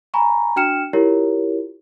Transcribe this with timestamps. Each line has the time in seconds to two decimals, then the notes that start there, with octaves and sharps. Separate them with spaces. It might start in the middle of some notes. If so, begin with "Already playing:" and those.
0.14 G#5 A#5 B5 C#6
0.56 D4 F#4 G5 F6 C#7 E7
0.93 E4 F4 G4 A#4 C#5